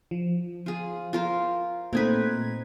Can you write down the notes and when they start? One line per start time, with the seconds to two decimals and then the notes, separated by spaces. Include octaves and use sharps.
0.11 F3
0.66 F4 G#4
1.13 F4 A#4 C5
1.93 A#2 A3 C4 D#4 B4 G#6